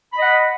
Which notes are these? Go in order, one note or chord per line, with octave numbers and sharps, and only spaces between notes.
D#5 F#5 B5